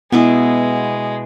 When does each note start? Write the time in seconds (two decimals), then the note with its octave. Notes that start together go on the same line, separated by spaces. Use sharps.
0.12 B2 G#3 B3 E4 D6